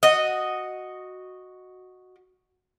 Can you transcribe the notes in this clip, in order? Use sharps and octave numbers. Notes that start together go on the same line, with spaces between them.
F#4 D#5